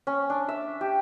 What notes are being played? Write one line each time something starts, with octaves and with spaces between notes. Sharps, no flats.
C#4
D4
E5
G4